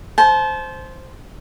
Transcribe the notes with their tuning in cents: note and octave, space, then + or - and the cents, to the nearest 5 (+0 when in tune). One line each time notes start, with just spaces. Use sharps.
C5 +0 A5 -35